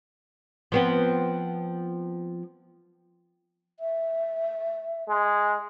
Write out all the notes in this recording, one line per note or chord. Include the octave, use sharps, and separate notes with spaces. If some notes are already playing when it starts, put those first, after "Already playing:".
F3 B3 C4
E5
G#3